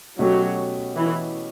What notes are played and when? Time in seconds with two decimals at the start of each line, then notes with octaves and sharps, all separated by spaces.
0.19 B2 F#3 A3 C#4 G4
0.96 E3